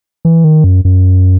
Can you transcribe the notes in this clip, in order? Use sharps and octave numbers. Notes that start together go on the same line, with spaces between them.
E3
D#3
F#2
F#2